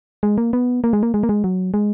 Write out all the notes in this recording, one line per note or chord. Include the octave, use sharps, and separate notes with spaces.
G#3
A#3
B3
A#3
G#3
A#3
G#3
A#3
G#3
F#3
G#3